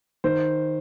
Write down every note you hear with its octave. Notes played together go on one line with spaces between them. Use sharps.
D#3 C5